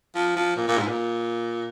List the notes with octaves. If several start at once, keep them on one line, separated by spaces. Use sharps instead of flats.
F3
F3
A#2
A#2
G#2
A#2